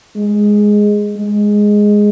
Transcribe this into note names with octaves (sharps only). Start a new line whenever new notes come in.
G#3
G#3